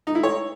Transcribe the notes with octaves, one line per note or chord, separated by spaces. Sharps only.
D#4
E4
C#5